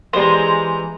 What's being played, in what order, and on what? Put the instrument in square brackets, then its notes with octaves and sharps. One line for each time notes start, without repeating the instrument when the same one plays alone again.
[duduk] E3 [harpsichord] G3 B3 [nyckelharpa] G#3 A#5 [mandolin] C5